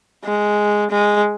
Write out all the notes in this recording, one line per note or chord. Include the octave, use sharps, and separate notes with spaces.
G#3
G#3